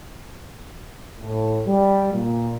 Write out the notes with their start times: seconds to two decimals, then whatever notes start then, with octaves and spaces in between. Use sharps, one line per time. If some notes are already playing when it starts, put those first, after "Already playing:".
1.21 A2
1.66 G3
2.13 A#2